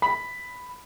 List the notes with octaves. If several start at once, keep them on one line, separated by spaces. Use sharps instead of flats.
B5